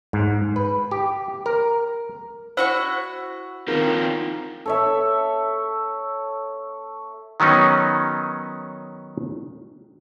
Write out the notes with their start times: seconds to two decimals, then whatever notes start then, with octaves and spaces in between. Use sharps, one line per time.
0.13 G#2
0.56 B4
0.91 G4
1.46 A#4
2.57 E4 F#4 C5 C#6
3.68 D#3 A#3 C4 F4 A#4
4.66 A4 C#5 E5
7.40 D#3 F#3 B3 C#4 D#4